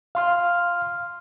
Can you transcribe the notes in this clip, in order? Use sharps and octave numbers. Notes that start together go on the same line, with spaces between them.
F5 C6 F6